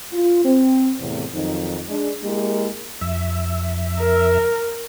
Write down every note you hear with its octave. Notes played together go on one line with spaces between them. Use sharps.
F4
C4
E2 A2 C3
F2 D#3 F#3 D#4
G#3 D4
G#3 A#3 E4 G4 A#4
F2 E5
A#4